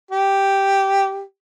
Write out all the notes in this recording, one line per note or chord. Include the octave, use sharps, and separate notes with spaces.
G4